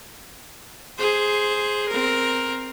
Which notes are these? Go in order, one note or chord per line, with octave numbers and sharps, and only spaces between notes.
G#4 C5
C4 A#4